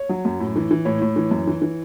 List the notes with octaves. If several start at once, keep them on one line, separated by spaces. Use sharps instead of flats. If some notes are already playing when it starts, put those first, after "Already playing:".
Already playing: C#5
F#3
F#2
A2
E3
E3
A2 C#5
A2
E3
F#2
E3
E3